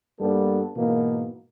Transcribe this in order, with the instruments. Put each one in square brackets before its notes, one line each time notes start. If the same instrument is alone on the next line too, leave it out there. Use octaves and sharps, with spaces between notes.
[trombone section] G2 G3 A#3 B3 A4
G#2 B2 E3 A#3